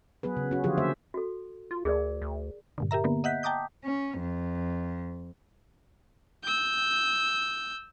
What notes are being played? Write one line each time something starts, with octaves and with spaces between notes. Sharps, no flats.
F#3 B3 G#4 B4
C#3
C#4 F#4
D3 F3 F#3 F4 G4 G#4
D3 A#3 C5 E5
F#4 A4
F4
D2 G#4 A#4 D5
D2
G2 A#2 D3
G4 A#4 E5 A#5
D3 A#3 B3
D#5 E5 F#5 F#6 G6 B6
G5 A5 A#5 D6 D#6 G6
C#4
F2
E6 G6